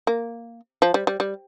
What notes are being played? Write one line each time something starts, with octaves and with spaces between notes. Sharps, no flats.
A#3
F3
G3
G3
G3